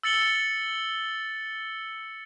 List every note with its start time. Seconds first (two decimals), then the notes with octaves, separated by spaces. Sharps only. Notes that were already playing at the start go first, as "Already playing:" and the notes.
0.03 E6 A6 C#7 F#7 G7